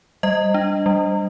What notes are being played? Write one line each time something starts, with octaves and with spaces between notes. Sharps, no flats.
G3 D#5
D4
G3